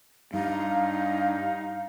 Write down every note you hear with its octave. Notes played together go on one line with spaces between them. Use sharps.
G2 D#4 F5